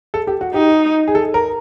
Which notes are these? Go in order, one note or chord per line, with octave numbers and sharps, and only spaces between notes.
A4
G4
F#4
D#4 G4
G#4
A4
A#4